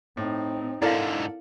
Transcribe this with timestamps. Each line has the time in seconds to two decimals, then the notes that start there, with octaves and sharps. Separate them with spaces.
0.17 A2 C4 D#4
0.82 G#2 D3 E4 A4 A#4 D5 F5